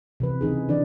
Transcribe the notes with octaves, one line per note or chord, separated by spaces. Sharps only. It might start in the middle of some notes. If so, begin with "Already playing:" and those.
C3 E3 B4
C#3 E3 D#4 G#4
D3 E3 D4 D5